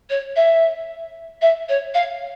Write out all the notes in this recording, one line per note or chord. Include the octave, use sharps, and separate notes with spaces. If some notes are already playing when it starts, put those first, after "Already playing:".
C#5
E5
E5
C#5
F5